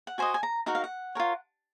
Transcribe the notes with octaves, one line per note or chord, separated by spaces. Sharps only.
F#5
F#4 C5 D#5 G#5
G#5
A#5
D#4 F#4 A#4 F#5
F5
F#5
F4 A#4 C#5